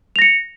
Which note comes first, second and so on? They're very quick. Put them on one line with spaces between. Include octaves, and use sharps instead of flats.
F7 A#6 C#7